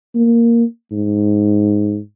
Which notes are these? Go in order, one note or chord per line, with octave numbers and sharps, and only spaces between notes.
A#3
G#2